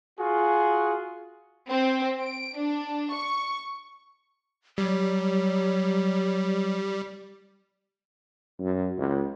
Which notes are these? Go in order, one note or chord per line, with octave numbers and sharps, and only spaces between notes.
F4 F#4 G#4
C4
D7
D4
C#6
F#3 G3
F#2
C#2